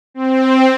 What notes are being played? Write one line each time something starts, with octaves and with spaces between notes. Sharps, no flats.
C4